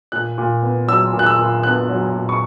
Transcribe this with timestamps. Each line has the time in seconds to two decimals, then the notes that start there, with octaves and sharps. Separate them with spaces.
0.12 A#2 F#6
0.38 A#2
0.62 B3
0.88 F#3 E6
1.13 A#2
1.19 F#6
1.26 E6
1.39 A#2
1.63 B3 F#6
1.90 F#3
2.14 A#2
2.29 C#6